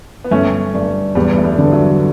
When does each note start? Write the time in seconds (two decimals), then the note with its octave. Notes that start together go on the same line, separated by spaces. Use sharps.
0.24 B3
0.31 G1 A3 C#4
0.74 G2
1.15 E2 G3 B3
1.37 A3
1.44 G3 B3
1.58 D3
1.72 F#3 A3